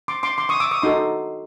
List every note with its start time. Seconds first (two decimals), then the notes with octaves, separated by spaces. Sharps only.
0.08 C6 D6
0.23 C6 D6
0.38 C6 D6
0.49 C#6 D#6
0.60 D6 E6
0.71 C#6 D#6
0.82 D#4 F#4 A4 C6 D6